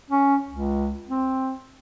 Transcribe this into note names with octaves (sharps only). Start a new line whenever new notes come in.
C#4
C#2
C4